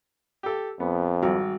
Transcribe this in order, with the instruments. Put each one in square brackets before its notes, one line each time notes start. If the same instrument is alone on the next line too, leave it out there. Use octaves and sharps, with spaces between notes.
[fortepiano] G4 A4
[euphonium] F2 [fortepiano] B3
[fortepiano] G#1 [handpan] G3 F#4